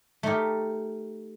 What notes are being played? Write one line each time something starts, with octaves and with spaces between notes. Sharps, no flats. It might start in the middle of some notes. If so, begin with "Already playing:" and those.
A3 D#4 G4 A#4